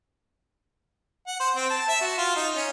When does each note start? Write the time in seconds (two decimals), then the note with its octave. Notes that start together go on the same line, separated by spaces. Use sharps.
1.27 F#5
1.40 C5
1.56 C4
1.70 A5
1.88 E5
2.01 F#4
2.18 F4
2.36 D#4
2.56 C#4